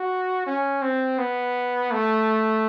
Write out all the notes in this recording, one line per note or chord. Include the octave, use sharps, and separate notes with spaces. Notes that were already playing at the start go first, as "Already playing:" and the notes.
Already playing: F#4
C#4
C4
B3
A3